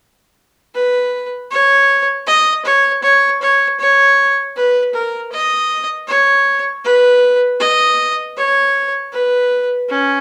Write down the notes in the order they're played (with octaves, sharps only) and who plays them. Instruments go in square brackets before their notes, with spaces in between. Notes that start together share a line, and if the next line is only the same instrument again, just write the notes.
[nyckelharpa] B4
C#5
D#5
C#5
C#5
C#5
C#5
B4
A#4
D#5
C#5
B4
D#5
C#5
B4
C#4